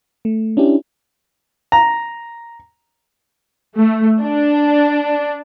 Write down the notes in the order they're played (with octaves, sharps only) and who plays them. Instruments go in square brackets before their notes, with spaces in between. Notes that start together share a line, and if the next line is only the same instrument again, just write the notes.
[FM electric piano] A3
C#4 D4 E4 G4
[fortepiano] A#5
[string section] A3
D4